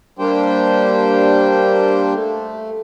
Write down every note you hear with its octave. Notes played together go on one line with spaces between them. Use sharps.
G3 A#3 D4 G4 C5 G5
A3